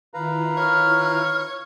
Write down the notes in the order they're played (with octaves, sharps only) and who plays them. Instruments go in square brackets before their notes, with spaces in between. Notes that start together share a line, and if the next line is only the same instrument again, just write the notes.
[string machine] D#3 E4 F4 [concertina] B4 F5 A#5
[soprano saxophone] C#5 [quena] F6